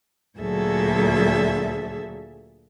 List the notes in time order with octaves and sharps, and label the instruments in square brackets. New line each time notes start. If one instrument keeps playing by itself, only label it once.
[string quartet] D2 A#2 F#3 G#4 A4 E5